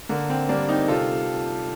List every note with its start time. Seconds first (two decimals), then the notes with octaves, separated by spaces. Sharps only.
0.09 D3 A#3
0.30 C4
0.49 G3 A#3 D4
0.69 C4 D#4
0.88 C3 F4 A4